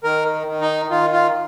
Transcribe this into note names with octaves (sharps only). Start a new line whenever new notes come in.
D#3 A#4
D#3
D#4
D#3 F4
F4